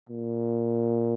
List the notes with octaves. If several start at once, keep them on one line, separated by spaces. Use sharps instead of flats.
A#2